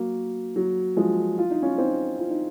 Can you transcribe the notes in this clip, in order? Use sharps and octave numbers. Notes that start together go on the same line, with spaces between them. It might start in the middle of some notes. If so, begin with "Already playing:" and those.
Already playing: F#3 A#3
F#3
F3 G#3
F4
D#4
C#4 F4
C4 D#4
F4
D#4